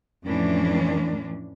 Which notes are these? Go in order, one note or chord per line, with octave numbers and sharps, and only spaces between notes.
F2 A2 E3 A3 C#4 D4